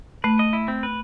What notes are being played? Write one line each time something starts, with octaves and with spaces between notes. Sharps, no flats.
A3 B4
D#5
E4
C4
B4